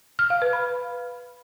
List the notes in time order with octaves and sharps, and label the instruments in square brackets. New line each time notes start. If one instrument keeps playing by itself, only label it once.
[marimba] F6
F5
B4
B5